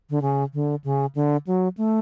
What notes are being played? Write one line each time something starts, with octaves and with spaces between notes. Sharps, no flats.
D3
C#3
D3
C#3
D3
F#3
A3